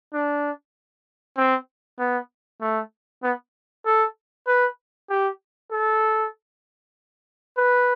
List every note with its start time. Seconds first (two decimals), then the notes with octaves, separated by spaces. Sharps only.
0.13 D4
1.37 C4
1.99 B3
2.61 A3
3.23 B3
3.86 A4
4.47 B4
5.10 G4
5.72 A4
7.57 B4